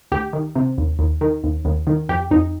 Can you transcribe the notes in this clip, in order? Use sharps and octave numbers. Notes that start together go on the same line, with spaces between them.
D2 G4
D#3
C3
D#2
D#2
D#3
D#2
D#2
D#3
F2 G4
F2 D#4